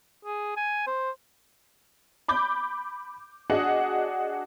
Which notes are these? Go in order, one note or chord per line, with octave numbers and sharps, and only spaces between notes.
G#4
G#5
C5
B5 D6 G6
D4 F#4 G#4 D#5 F#5